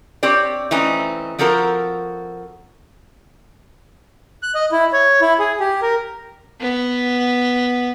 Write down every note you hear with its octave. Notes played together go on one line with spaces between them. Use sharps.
C4 G4 C#5 D5
E3 A3 C4 C#4 D#4
F3 C4 F#4 A4 A#4
F#6
D#5
E4
C#5
E4
G#4
G4
A#4
B3